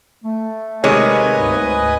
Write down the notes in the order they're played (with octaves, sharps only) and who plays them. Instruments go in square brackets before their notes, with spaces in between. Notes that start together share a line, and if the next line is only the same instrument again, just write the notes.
[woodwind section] A3
[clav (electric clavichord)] C3 D#3 G#3 [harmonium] B4 D#5 G#5 [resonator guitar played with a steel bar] C#5
[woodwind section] D2 G#2